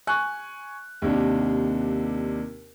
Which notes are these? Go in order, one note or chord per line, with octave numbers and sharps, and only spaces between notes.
G#5 C#6 F#6
D#2 C3 D4